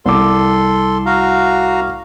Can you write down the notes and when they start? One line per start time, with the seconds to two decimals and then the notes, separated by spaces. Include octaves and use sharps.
0.06 C2 A4 C6 D6
1.06 F#4 F5 A#5